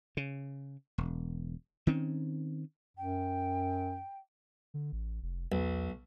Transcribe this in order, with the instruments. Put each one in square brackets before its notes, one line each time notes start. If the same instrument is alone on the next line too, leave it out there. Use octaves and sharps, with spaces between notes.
[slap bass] C#3
E1
D#3 C4 C#4
[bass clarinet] F#2 [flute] G5
[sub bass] D3
A1
F1
[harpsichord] B1 [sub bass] E2